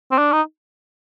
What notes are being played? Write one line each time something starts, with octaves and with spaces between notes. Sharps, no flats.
C4
D4
D#4